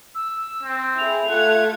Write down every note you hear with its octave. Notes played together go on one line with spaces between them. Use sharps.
E6
C4
E4 G#4 F7
A3 F4 F#5 G#6